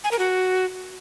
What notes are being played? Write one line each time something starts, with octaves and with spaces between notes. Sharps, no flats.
G#5
A#4
F#4